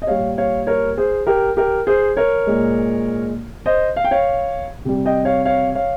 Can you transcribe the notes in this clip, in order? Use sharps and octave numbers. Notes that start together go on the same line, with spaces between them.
D#5
A#2 G3 C#5 F5
C#5 F5
A#4 C#5
G#4 C5
G4 A#4
G4 A#4
G#4 C5
A#4 C#5
A#2 G#3
C5 D#5
F5
G5
C#5 F5
C3 G3
D#5 G5
C#5 F5
C#5 F5
C#5 F5